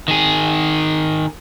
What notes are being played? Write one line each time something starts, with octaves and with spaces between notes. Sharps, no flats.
D#3 G#4